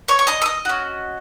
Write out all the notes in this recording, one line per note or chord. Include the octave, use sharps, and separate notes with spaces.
C#5 C#6
C#6
D#5 D#6
E6
D#5 D#6
C#4 F#4